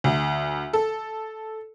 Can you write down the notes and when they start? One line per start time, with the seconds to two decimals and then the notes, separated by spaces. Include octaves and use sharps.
0.04 D2
0.73 A4